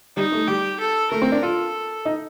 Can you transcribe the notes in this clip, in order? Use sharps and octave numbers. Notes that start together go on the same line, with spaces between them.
G3 D#4
A3
G3 G4
A4
A3 A#4
C4
D4
F4 A4
D#4